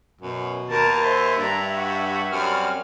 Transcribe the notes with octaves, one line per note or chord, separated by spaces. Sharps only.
F#2 B2
D#2 A#4 A5
C5 E5
G2 D4 A#5
F#4
F#2 G3 C4 F6